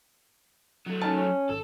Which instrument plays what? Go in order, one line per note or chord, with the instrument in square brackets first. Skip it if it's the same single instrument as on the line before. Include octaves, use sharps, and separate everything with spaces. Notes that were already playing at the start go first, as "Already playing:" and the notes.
[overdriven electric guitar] F#3 A3
[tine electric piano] C#4 D#4 A#4 [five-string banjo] A5
[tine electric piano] C#4 C#5
[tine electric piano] G#1 [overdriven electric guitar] A4